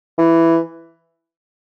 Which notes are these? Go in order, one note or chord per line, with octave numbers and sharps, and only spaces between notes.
E3